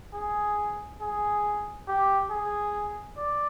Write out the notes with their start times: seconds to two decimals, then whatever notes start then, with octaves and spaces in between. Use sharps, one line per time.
0.14 G#4
1.01 G#4
1.88 G4
2.31 G#4
3.18 D5